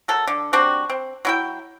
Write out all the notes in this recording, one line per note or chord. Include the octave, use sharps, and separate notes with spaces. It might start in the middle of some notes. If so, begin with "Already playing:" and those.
F#3 A4 A#4
D3
G3 C4 D4 F#4
C4
F#3 E4 G5